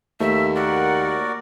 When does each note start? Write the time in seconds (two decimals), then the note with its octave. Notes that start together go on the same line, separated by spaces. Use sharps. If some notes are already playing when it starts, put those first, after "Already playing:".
0.20 D#2 A3 E5
0.56 F#4 A#4 D5 F#5